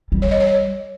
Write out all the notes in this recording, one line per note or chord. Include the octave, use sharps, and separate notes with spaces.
G3
C#5
D#5
C#5